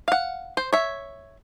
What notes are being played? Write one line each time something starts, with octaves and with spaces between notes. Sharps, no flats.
F5 F#5
C5
C#5 E5